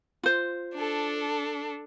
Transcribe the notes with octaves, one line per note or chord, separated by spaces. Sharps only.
F4 C5
D4 A4